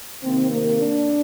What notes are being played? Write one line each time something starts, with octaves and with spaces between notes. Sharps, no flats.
C3 D#3 A#3 C4
A#3
D4